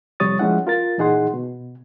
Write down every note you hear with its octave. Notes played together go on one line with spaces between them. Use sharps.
F2 C3 G3 C#5 D#6 A6
F3 G#3 C#4 E4 F#5
F4 A#4 A6
A#2 E3 D#4 G#4 F#5 C6
B2